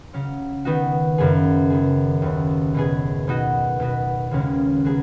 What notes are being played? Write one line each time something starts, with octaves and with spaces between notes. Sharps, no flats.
C#3 F#3 C#4
D#3 B3 D#4 F#4
F#2 C#3 B3 G#4
D#3 B3 G#4
D#2 C#3 B3
B2 B3 G#4
B2 B3 D#4 F#4
B2 B3 F#4
D#2 C#3 G#3 C#4 G#4
F#3 B3 G#4